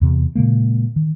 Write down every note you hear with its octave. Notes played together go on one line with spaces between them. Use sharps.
E2 C3
A#2 C#3 G#3 A#3
D#3